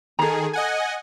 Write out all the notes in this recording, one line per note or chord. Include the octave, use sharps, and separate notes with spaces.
D#3 G#4 A4 A#5
D#5 F#5 G#5